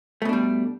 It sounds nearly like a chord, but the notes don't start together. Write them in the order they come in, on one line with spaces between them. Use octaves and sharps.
A3 B2 D4 G3